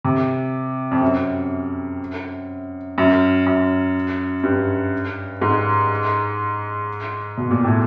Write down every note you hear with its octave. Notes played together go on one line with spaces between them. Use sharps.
C3
F2
F#2
F#2
F#2
G2
G#2
B2
A#2
A2